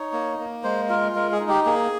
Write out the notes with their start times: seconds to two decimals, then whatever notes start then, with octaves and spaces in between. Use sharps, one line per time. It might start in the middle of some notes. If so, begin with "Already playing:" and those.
Already playing: D#4 C#5
0.13 A#3
0.39 A#3
0.64 G#3 C5
0.89 F4 A#4
1.15 G#3 A#4
1.32 G#4
1.40 D#4
1.48 G4
1.66 A#3 G#4